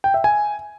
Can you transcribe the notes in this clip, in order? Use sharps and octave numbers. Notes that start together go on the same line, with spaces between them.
G5
E5
G#5